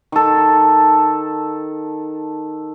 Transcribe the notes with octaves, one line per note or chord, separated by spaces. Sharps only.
D#3 A4